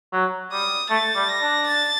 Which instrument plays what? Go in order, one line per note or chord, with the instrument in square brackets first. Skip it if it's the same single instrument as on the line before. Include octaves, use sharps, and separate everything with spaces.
[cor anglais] F#3
[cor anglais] G3 [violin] D#6
[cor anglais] A3 [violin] A6
[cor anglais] G3
[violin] A#6
[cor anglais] D4
[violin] A6